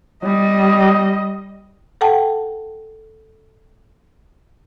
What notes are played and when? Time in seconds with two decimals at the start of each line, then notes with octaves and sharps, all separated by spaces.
0.24 G3 D#5
2.01 A4 F#5 G5 A5